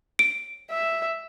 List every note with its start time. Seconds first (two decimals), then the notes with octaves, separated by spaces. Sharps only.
0.19 D7
0.71 E5